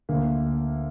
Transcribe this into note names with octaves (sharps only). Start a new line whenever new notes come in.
D2 A#3